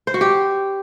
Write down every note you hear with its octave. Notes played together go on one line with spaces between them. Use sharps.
C5
F#4
G4